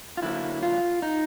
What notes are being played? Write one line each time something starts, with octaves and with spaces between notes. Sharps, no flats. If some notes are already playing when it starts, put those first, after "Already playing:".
F4
D3 F#3 A#3 E4
F4
D#4